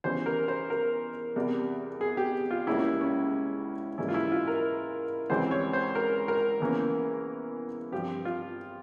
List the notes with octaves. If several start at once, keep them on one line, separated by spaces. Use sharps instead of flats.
E2 E3 G3 C#4 C5
A#4
C5
A#4
E2 C3 G3
G#4
G4
F4
C#2 C#3 G3 A#3 C#4 E4
C#4
C#4
G#2 E3 G3 A#3 C#4 E4
F4
E4
F4
A#4
C#2 C#3 E3 G3 C4 C5
C#5
C5
A#4
A#4
E2 E3 A#3 C#4
G2 F3 C4 G4
F4